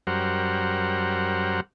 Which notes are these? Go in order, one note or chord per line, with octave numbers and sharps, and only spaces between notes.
F#2 G3 A#4 C5 F#5